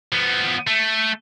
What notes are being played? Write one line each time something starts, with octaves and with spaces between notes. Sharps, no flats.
F3 B3
A3